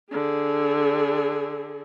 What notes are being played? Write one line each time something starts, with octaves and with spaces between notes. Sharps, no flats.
D3 G#4